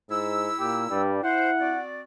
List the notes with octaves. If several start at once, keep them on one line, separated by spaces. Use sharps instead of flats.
G#2 E4 E6
A#2 G4
G2 G3
E4 C5 F#5
C4 F#4 D5